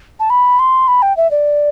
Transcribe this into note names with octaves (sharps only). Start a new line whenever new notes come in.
A5
B5
C6
B5
G5
E5
D5